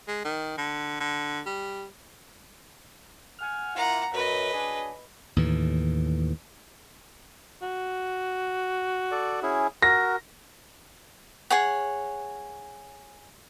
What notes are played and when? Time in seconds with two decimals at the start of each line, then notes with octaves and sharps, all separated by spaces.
0.08 G#3
0.24 D#3
0.58 D3
1.00 D3
1.46 G3
3.39 F#5 G#5 F6
3.76 A#3 E4 F4 F#5 A#5
4.14 F#2 B4 D#5
4.53 F#3 D4 G#4
5.36 D#2 A2 E3
7.62 F#4
9.11 A4 D5
9.43 C#4 E4 G#4
9.82 F#4 A#4 A#6
11.50 G#4 C#5 F#5